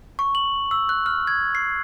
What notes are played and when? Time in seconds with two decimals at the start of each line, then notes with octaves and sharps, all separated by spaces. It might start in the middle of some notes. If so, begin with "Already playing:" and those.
0.19 C#6
0.35 F#7
0.71 E6
0.89 F#6
1.06 F6
1.27 G#6
1.55 C7